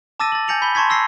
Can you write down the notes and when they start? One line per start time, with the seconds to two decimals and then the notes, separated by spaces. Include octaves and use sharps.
0.20 A5 D6 E6 A6 A#6 D#7
0.32 A6 F#7
0.48 G#5 G6 A#6 C#7 F7 F#7
0.62 B5 G6 B6 G7
0.75 A5 C6 C#6 G#6 B6
0.90 E6 A#6 C7